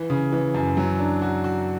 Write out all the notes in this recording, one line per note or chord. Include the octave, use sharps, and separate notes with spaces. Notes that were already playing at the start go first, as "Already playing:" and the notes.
Already playing: E3
C#3
E3
F#2
F#3
D4
F#4
F#4